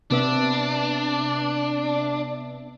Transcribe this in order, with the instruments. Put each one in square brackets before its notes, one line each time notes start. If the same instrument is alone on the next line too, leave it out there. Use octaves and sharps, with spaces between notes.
[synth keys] C3 B3 E5 [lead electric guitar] D4